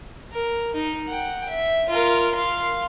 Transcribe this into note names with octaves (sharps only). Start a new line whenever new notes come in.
A#4
D#4
F#5 G5
E5
F4 A#4
F5 C6